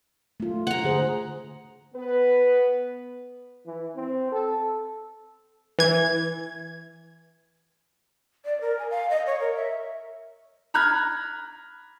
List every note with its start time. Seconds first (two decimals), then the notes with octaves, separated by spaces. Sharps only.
0.40 A3 F4
0.67 F#5 A#5
0.84 D3 G#4 C5
1.95 B3 B4
3.66 E3
3.95 C4
4.32 A4
5.79 E3 G#6
8.45 D5
8.61 A#4
8.79 G#5
8.90 F5
9.10 D#5
9.26 C#5
9.41 A#4
9.55 E5
10.74 A#5 B5 F6 F#6 G#6